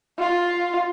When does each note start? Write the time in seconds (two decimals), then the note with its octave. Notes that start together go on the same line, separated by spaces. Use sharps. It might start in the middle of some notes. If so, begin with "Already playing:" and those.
0.19 F4